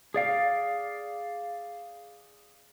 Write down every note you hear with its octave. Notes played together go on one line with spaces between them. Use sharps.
G#4 D5 F5